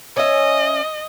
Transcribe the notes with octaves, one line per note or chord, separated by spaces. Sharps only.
C#4 D#5 E5